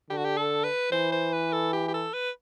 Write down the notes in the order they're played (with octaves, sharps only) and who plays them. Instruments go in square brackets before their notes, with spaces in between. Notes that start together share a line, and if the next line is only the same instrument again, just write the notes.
[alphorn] D3 [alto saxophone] G4
[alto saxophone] F#4
G4
A4
B4
[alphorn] E3 [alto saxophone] C5
[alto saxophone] C5
B4
A4
G4
G4
A4
B4